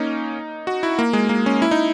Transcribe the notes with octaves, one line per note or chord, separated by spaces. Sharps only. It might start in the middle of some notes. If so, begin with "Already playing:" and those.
Already playing: A#3 C#4 D#4
F#4
E4
A#3
G#3
A#3
C#4
E4
D#4